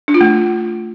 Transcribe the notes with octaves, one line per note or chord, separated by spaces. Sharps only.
D4
F4
A3